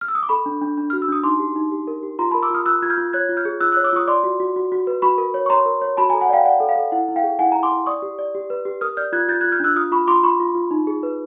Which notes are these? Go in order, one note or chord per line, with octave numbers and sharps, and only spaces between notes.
F6
E6
D#6
D6
A4 B5 C#6
D4
D4
D4
F#4 F6
E6
D4 D#6
D#4 C6 D6
G4
D#4
G4
A#4
G4
F4 A#5 C6
A#4 A5 B5
D6 E6
F4 D#6 F6
F4 E6 F#6
F4 G#6
F6 G6
F4
C#5 F#6 G#6
F4
F6 G6
G#4
F4 E6 F#6
E6 F#6
C#5
D6 E6
F4 C#6 D#6
D5 C6 D6
F#4
F#4
F#4
F#4
B4
F#4 B5 C#6
A#4
C#5
C#6
C#5 A#5 C6
A#4
C#5
F#4 A5 B5
G#5 A#5
A4
F#5 G#5
D5 F5 G5
D5 F#5
A4
F5
A4
E4 F#5
E4
F5 G5
G#4
E4 F#5 G#5
E4 G#5 A#5
C6 D6
E4
D5 C#6 D#6
G4
D5
G4
B4
G4
A#4 D#6 F6
D5 F6 G6
F4 F#6 G#6
F4 G6 A6
F4 F#6 G#6
F6 G6
D4 E6 F#6
F4 D#6 F6
F4 B5 C#6
F4 C6 D6
F4 B5 C#6
F4
F4
D#4
G#4
B4